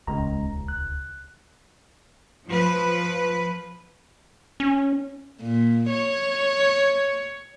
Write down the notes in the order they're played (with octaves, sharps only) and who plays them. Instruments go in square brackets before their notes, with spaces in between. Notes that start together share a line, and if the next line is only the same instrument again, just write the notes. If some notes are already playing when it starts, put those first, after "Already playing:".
[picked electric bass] D#1 C#2 [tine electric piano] C#3 G#3 A#5
[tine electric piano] F#6
[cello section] F3 B4
[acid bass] C#4
[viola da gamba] A#2
C#5